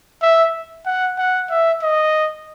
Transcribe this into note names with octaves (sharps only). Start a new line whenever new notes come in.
E5
F#5
F#5
E5
D#5